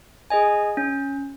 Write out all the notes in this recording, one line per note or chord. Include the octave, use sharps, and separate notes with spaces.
G#4 D#5 G#5
C#4